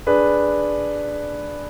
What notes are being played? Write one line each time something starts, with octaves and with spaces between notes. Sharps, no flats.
D4 G#4 B4